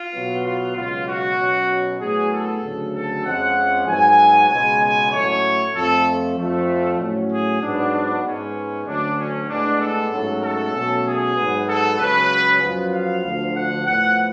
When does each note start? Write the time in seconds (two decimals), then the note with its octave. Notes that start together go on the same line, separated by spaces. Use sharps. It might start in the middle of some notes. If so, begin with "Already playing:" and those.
Already playing: F4
0.13 B2 F#3 B3
0.44 F4
0.75 C#2 B2 F#3 F4
1.07 F#4
1.38 B2 F#3 C#4
2.00 A2 F#3 B3 G#4
2.32 A4
2.62 D2 C#3 F#3
2.94 A4
3.24 F2 F3 G#3 C#4 F#5
3.87 G#2 F#3 B3 G#5
4.49 C#2 B2 G#3 G#5
4.81 G#5
5.12 A2 F#3 A3 C#4 C#5
5.74 F2 F3 A3 A4
6.37 F2 F3 A3
6.99 A2 F#3 C#4
7.31 G#4
7.61 G#2 F#3 B3 D4
8.24 G#2 G#3 B3 C#4
8.86 D2 D3 F#3 C#4 D4
9.17 C#4
9.49 A2 G#3 B3 D4
9.81 A4
10.12 G#2 F#3 A3 C#4
10.43 A4
10.74 B2 F#3 A3 C#4
11.05 G#4
11.36 G#2 F#3 B3
11.67 A4
11.98 C#2 C#3 F#3 C#4 B4
12.61 F#2 F3 B3
12.92 F5
13.24 D2 D3 F3
13.54 F#5
13.85 A2 F3 B3 F#5